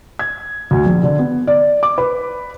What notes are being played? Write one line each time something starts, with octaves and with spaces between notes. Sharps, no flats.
G#6
D2
A#1
D3
B3
D5
D6
B4